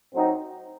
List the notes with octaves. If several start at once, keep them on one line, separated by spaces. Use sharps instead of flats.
A2 F#3 C4 D#4